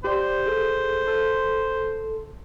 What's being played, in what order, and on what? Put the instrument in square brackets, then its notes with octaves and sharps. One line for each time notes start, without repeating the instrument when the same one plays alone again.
[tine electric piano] G4 D5 [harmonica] C5
[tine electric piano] G#4 A4
A4 C6